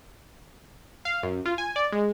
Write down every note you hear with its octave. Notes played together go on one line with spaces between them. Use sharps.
F5
F#2
F4
G#5
D5
G#3